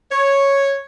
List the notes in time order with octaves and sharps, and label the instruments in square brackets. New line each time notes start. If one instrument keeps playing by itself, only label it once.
[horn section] C#5